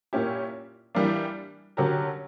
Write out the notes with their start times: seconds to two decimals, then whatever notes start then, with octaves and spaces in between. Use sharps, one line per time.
0.13 A#2 A#3 C#4 E4 G4
0.95 E3 G3 A#3 D4
1.77 D3 F#3 C#4 G4 A#4